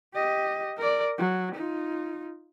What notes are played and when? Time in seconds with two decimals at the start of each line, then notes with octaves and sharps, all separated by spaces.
0.14 G4 D#5
0.78 A#4 D5
1.18 F#3
1.55 D#4 F4